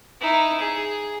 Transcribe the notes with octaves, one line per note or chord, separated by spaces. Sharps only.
D#4 E4
G#4